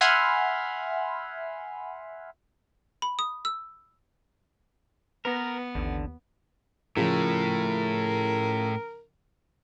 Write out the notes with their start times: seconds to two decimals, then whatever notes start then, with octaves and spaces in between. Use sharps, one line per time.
0.01 E5 F#5 G#5 B5 C6 F6
3.02 B5
3.19 D#6
3.45 E6
5.25 B3 A#4 B4 A#6
5.75 A1 D#2 D3
6.97 A2 C#3 F3 A#4